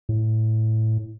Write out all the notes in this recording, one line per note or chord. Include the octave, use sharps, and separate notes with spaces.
A2